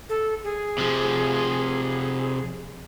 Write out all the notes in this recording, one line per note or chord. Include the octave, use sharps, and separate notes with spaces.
A4
G#4
C3 F3